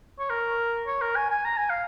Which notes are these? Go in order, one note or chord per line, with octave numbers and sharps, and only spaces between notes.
C#5
A#4
C#5
A#4
G#5
G#5
A#5
G#5
F5